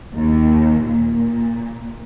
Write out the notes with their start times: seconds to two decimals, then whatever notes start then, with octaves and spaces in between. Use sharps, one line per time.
0.13 D#2
0.85 A#2